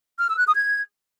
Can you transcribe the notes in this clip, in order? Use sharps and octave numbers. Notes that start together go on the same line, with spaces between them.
F6
E6
F#6
D#6
G#6